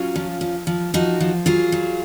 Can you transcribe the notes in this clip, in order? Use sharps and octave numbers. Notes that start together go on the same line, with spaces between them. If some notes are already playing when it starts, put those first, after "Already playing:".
Already playing: F#3 C#4 F4
F3
F3
F3
F3 D#4 F#4
F3
F#3 F4 G#4
F#3